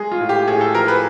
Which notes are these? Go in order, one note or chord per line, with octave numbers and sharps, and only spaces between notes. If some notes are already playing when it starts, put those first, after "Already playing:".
Already playing: G#3 G#4
F4
A2
G4
A2 G#4
A4
F3 A#4
B4